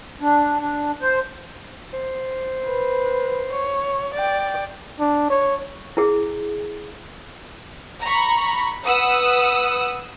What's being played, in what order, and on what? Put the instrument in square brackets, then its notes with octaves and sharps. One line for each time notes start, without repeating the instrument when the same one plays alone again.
[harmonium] D4
D4
C5
[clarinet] C5
[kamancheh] B4
C#5
D5 G5
[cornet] D4
C#5
[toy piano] E4 G#4
[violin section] A#5 B5 C#6
B4 F#5 D#6 E6